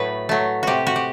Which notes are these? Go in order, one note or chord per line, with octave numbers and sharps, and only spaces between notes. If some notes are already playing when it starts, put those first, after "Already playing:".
Already playing: A2 F#3 A3 B4
F#3 A3
C3 F#4 G4
F#4
G4